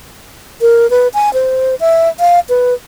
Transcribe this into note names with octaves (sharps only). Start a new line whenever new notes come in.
A#4
B4
G#5
C5
E5
F5
B4